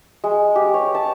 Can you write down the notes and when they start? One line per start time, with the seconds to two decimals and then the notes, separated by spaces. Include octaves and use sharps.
0.24 G#3
0.56 G4
0.74 C#5
0.95 A5